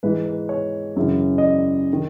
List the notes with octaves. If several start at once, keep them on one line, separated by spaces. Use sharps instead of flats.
G#2 E3 B4
B4
C#5
F#2 C#3 E3
D#5
D5
D#3